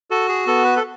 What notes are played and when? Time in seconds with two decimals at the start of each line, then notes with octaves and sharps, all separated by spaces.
0.11 F#4 A4
0.29 G#4
0.46 B3 A4
0.64 B4
0.76 A4